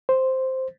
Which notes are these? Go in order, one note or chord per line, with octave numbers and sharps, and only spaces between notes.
C5